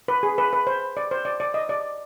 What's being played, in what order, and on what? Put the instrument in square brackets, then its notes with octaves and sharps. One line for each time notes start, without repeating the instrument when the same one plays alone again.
[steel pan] B4
G#4
B4
B4
C5
D5
C5
D5
D5
D#5
D5